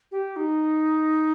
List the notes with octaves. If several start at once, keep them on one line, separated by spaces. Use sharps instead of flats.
G4
D#4